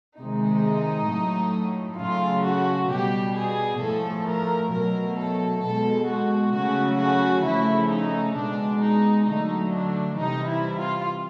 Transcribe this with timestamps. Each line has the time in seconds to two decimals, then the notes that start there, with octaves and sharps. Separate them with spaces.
0.19 C3 D#3 G#3 D#4
1.10 A2 F#3 A3
2.00 C#3 F#3 A3 F4
2.46 F#4
2.91 B2 G3 G4
3.38 G#4
3.82 A2 F3 A3 A4
4.28 A#4
4.74 B2 F#3 A3 A#4
5.19 A4
5.64 B2 G#3 A4
6.10 F#4
6.55 C#3 F#3 A3 F#4
7.01 F#4
7.46 C#3 F3 A3 E4
7.92 D#4
8.37 B2 G#3 D4
8.83 D#4
9.28 D3 F#3 A3 D#4
9.73 D4
10.19 C3 E3 G3 D#4
10.49 E4
10.79 F4